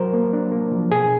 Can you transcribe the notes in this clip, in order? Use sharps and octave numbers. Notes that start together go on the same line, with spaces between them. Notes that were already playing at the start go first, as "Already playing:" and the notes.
Already playing: F#3 A#4 C5
A#3
D4
A#3
F3
B2 G#4